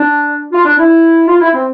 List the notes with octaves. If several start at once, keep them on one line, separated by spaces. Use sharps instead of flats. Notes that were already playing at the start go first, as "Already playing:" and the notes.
Already playing: D4
F4
D4
E4
F4
E4
C4